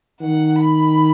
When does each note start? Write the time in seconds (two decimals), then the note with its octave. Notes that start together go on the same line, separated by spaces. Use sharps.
0.21 D#3 F#5
0.56 B5